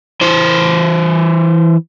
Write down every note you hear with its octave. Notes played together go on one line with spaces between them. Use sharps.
E3 C5